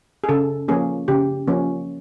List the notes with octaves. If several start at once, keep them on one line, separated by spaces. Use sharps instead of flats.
G#4
C#3 A4
F3 A#3 C#4 G#4
C#3 G4
F3 A#3 C#4